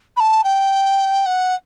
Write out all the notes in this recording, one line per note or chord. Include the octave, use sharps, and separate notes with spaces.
B5
A5
G5
F#5